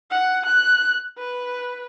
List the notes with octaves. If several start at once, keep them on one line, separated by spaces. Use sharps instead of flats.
F#5
F#6
B4